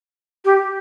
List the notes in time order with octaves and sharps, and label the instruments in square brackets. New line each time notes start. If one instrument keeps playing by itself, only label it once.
[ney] G4